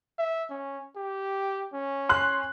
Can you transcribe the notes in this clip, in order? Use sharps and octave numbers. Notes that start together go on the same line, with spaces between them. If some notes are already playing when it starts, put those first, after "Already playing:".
E5
C#4
G4
C#4
C6 F#6